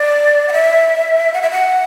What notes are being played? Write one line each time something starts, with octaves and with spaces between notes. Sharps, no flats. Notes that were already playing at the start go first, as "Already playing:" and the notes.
Already playing: D5
F#5
E5
F#5
E5
F#5